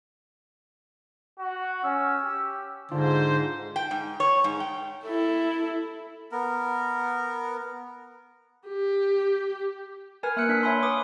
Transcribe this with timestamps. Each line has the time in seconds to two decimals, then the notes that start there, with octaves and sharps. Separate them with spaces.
1.40 F#4
1.84 C#4 E6
2.25 G4
2.91 G#2 D3 D4 F4 C5
3.76 G5
3.91 G#2
4.20 C#5
4.44 G#2
4.60 G5
5.04 E4 A4
6.32 B3 A#4
8.67 G4
10.23 A#4 B4 G#5 F6 G#6
10.36 A#3 E5 E6 F#6 C#7
10.49 D4 B6
10.63 C#5 E5 G#5 B5 C6
10.82 B4 D6 D#6